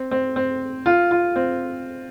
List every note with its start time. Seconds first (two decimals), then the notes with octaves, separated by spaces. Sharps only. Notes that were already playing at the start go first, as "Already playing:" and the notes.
Already playing: C4
0.11 C4
0.36 C4
0.86 F4
1.11 F4
1.36 C4